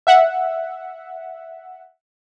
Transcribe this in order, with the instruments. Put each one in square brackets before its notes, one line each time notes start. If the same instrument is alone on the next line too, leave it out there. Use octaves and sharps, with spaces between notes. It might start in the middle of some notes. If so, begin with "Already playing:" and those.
[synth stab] E5 F#5